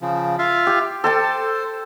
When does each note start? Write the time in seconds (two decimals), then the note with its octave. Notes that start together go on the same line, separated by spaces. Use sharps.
0.01 C#3 F3
0.39 F4 E5 F5
0.67 G4
1.04 A4 C5 G5 A5